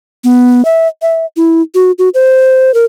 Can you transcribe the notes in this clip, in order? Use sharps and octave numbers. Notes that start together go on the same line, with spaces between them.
B3
E5
E5
E4
F#4
F#4
C5
A#4